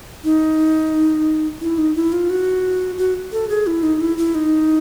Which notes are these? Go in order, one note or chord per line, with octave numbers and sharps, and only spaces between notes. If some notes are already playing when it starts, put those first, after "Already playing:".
D#4
E4
D#4
E4
F4
F#4
F#4
A4
G#4
E4
D#4
E4
E4
D#4